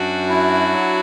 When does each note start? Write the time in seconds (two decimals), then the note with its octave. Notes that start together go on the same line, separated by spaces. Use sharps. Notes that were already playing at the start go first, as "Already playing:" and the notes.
Already playing: F#2 D4 F#4
0.29 E4
0.72 F#3